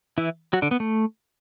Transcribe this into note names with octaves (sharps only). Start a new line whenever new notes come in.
E3 E4
F#3 F#4
D3 D4
B3
A3